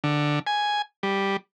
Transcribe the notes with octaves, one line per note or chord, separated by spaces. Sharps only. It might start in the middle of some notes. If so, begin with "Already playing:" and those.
D3
G#5
G3